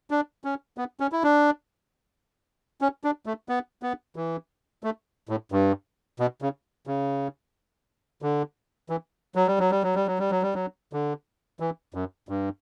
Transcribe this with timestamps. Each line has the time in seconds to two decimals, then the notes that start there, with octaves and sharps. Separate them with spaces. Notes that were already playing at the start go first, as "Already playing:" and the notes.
0.11 D4
0.44 C#4
0.78 B3
1.00 C#4
1.12 E4
1.23 D4
2.81 C#4
3.04 D4
3.26 A3
3.49 B3
3.83 B3
4.16 E3
4.84 A3
5.29 A2
5.52 G2
6.20 B2
6.42 C#3
6.87 C#3
8.22 D3
8.90 E3
9.35 F#3
9.47 G3
9.59 F#3
9.71 G3
9.83 F#3
9.95 G3
10.07 F#3
10.19 G3
10.31 F#3
10.42 G3
10.54 F#3
10.93 D3
11.60 E3
11.94 F#2
12.29 G2